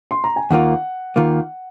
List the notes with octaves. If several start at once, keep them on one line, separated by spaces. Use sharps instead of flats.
C6
A#5
G#5
D#2 D#3 A#3 F4 F#5
D#2 D#3 A#3 F4